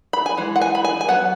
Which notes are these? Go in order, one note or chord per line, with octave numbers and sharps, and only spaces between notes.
B5
G#5
E3 G#3
F#5
G#5
B5
G#5
G#5
F#3 B3 F#5